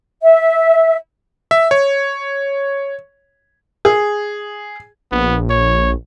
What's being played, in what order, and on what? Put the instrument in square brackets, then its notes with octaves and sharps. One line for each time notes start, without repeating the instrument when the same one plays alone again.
[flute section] E5
[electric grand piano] E5
C#5
[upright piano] G#4
[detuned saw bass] A#1 [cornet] B3
[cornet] C#5